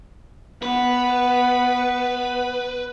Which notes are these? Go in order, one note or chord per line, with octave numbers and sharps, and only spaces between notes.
B3 B4